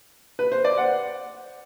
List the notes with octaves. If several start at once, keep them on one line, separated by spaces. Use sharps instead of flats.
B4
C5
D5
F#5